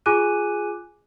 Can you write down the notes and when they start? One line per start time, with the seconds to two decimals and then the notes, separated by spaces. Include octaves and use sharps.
0.06 F4 G#4 G#5 D6 F#6 D#7